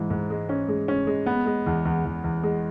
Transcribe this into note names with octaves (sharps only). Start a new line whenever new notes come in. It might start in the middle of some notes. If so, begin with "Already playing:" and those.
Already playing: G#2 E3
G#2
G#3
C#4
G#3
C#4
G#3
B3
G#3
E2
E2
E2
E2
G#3